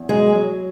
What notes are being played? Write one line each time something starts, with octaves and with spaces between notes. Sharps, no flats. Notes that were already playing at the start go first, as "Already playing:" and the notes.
Already playing: E2
F#3 G#3 G#4
F#3